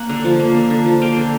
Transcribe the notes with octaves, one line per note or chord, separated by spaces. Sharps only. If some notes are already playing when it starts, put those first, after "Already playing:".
Already playing: A#3 F#5
D3
F3
A#3
D3
D3
F3
A#3 F5 G5
D3